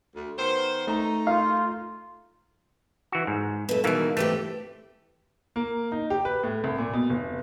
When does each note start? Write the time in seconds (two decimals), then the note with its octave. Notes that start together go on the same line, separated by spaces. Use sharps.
0.15 D2
0.38 D#3 B3 C5
0.87 A3 D#4 A#5
1.27 F4 F5
3.12 E3 F#4
3.27 G#2
3.69 B2 A3
3.84 B2 D#3 E3 G#3 A#3
4.17 E3 A3 C4 G4
5.56 A#3
5.92 D#4
6.10 G4
6.25 B4
6.43 A2
6.64 C2
6.78 A#2
6.93 B2
7.10 F1